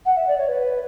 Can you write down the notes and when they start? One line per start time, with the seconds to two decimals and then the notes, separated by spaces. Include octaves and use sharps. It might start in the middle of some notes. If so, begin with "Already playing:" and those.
0.06 F#5
0.17 E5
0.27 D5
0.38 C#5
0.49 B4